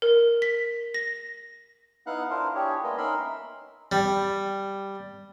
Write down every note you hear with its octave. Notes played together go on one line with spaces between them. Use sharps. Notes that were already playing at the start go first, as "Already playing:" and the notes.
A#4
B6
A#6
B3 D#4 E4 F5 F#5 F#6
D4 E4 F4 A#4 C5
D4 E4 G4 G#4 C#5
G#3 A#3 B3 D4 G#4 D#5
C#4 D#4 A#4 E5 B5 C6
G3